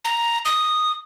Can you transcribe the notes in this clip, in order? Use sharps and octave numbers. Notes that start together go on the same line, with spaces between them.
A#5
D#6